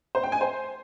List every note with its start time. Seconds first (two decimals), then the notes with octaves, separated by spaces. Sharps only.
0.15 C5
0.23 G5
0.32 G#5
0.41 C5